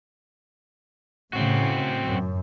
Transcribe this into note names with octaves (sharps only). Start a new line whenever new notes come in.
A2 C#3 C4 F#4
F#2